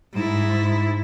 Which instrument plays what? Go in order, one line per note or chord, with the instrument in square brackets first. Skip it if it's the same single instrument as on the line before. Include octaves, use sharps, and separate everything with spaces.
[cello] G#2 E4